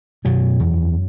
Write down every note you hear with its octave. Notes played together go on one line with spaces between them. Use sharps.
F#2 B2 F#3
E2